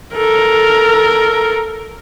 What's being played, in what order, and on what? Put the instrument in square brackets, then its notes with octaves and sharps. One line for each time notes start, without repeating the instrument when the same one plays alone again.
[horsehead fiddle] A4 A#4